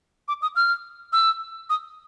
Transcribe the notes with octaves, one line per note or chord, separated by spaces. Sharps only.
D6
D#6
F6
E6
D#6